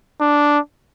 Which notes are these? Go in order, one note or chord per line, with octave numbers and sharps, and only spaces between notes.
D4